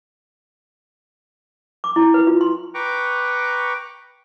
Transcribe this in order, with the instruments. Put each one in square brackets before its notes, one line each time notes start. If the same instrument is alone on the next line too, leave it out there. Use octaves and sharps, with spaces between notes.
[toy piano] D6
E4
B4
F4
C6
[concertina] B4 G5 A#5 C#6 D6